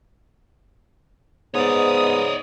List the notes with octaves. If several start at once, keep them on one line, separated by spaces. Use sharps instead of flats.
G#2 B3 C#5 D5 D#6